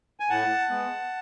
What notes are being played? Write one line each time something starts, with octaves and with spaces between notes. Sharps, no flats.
G#5
A2 F#5 A5
G#3 B3